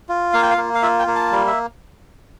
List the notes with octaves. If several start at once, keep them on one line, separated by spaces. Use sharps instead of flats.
F4
A#3 F5
G5
F5
A#3
F5
F4 E5
G5
A#3
A5
G3
E5